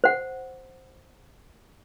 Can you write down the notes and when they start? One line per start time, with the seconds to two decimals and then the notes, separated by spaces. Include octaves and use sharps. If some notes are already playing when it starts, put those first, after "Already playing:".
0.04 C5 F#5